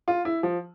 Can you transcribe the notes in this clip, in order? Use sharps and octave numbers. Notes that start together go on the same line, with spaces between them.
F4
E4
F3